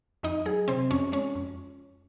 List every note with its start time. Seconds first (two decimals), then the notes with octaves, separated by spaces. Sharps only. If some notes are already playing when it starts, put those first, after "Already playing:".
0.23 F2 D#4 D#5
0.45 F#3 G#4
0.68 C3 C4 C5
0.90 F2 C#4 C#5
1.12 G#3 C#4 C#5
1.35 F2